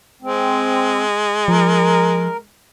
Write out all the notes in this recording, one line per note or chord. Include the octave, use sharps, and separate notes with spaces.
G#3 C4
F3 A#4